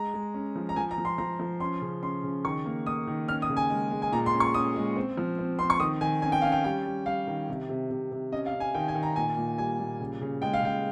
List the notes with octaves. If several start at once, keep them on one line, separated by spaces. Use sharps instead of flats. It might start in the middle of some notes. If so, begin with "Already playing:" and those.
Already playing: G#3 A#5
G#3
C#4
F3
A#5
F3 G#5
A#5
F3
C6
F3 A#5
F3
C#4 C6
C#3
C#4 C6
C#3
D#3 C#6
A#3
A#3 D#6
D#3
C#4 F6
D#6
C#3
G#5
G#3
G#3
G#5
A#2 A#5
C6
C#4
C#6
C#4 D#6
G#3
C4
F3
C4
C4 C6
C#6
D#3 D#6
D#3 G#5
C#4 G#5
G5
C#4 F5
G5
G3 G5
G3
G3 F5
D#3
C3
C3
C3
C3
C#4 D#5
F5
C#4
G#5
D#3 G5
G#5
D#3
A#5
A#2 G#5
A#2
G3 G#5
A#2
C#3
C#3
G#3 G5
F5
C#3 G5